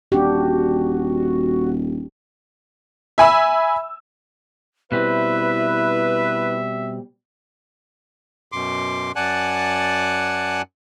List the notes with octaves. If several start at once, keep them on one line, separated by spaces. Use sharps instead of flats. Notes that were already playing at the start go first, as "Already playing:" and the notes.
D#1 D4 F#4 G4
E5 G#5 B5 E6
B2 G3 C4 E4 B4 E5
F#2 B2 C6 D6
F#2 D5 F#5 G#5 A5 F#6